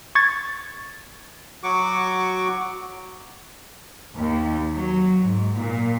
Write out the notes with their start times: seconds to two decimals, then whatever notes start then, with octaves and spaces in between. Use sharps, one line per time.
0.15 C#6 G#6 A6
1.63 F#3 F#4 C#6 D6
4.16 D#2
4.74 F#3
5.23 G#2
5.54 A#2